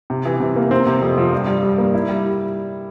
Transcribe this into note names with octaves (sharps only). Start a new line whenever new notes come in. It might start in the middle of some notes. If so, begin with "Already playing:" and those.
C3
E3
C3
A#3
C4
C3
F2
F3
G2
G3
G2
A#3
E4
G3